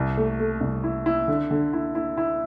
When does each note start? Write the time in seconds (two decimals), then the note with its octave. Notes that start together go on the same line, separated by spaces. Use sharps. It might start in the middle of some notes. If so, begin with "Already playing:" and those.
Already playing: C2
0.17 A3
0.39 A3
0.61 C2
0.84 E4
1.06 E4
1.28 D3
1.51 D3
1.73 E4
1.95 E4
2.18 E4